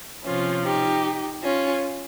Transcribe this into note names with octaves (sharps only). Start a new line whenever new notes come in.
C3 F3 C#4 F4
D#4 G4
C#4 F4